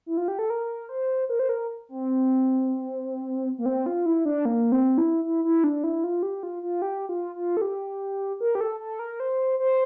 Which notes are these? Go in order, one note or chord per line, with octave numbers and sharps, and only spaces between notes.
E4
F4
G4
A4
A#4
C5
A#4
C5
A#4
C4
A#3
C4
F4
E4
D4
A#3
C4
E4
E4
E4
D4
E4
F4
G4
F4
F4
G4
F4
F4
A4
G4
A#4
G4
A4
A4
A#4
C5
C5